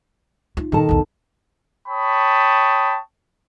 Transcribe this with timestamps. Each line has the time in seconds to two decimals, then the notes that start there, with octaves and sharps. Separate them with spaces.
0.57 D#4 F4
0.72 A#2 D#3 A4 A5
0.89 B1 E2
1.88 C#5 G5 A5 B5 C#6 D#6